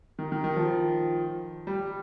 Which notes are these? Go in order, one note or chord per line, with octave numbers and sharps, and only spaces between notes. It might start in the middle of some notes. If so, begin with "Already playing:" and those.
D#3
D#3
D#3
F3
G3